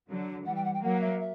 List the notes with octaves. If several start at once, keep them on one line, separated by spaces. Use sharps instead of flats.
D3 F#3
E3 G3 F#5
G5
F#5
G5
F#3 A#3 F#5
E5
E5